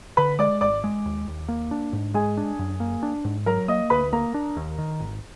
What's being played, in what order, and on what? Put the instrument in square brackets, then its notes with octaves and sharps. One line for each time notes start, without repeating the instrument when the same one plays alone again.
[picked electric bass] D3 [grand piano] B4 B5
[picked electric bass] G#3 [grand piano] D5 D6
[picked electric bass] G#1 [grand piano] D5 D6
[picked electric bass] G#3
D#2
D#2
A#3
D4
G#2
[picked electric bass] G#3 [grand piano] G#4 G#5
[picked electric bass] D4
F#2
A#3
D4
G#2
[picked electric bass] F#3 [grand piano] A#4 A#5
[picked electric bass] A#3 [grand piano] D#5 D#6
[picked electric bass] D2 [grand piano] B4 B5
[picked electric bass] A#3 [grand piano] A#4 A#5
[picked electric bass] D4
D#2
D#3
G#1